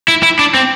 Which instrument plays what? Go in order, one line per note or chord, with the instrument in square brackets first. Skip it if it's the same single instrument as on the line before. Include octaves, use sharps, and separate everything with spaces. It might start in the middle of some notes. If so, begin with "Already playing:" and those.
[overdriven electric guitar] E4
E4
D4
C4